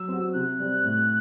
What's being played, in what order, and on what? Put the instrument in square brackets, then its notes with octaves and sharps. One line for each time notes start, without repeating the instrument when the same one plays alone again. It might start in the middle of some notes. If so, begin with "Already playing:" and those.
Already playing: [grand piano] F#3 [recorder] E6
[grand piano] C4 F#4
[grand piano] C3 [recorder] F#6
[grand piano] G3 C4
A2